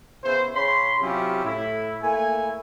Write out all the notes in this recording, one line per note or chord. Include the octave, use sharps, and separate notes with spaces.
C#3 B3 E4 C5
C#3 C#5 B5 C6
C3 F#3 C#4 E4 F4 G4
A2 E4
A3 A#3 E4 G#5